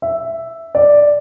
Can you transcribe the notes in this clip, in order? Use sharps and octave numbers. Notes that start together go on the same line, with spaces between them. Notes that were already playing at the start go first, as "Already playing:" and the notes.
E5
D5